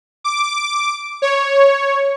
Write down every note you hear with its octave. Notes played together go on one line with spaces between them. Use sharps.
D6
C#5